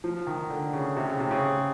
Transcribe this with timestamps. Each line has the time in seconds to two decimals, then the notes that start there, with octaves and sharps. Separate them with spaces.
0.04 F3
0.27 D#3
0.50 D3
0.73 C#3
0.97 C3
1.09 C#3
1.20 C3
1.31 C#3